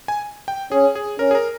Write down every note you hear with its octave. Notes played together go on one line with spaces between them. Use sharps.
G#5
G5
C#4 G#4
G#4
C#4 A#4
G#4
A#4